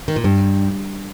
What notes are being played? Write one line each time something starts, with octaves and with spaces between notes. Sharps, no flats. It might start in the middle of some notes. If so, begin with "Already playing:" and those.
D#3
A#2
G2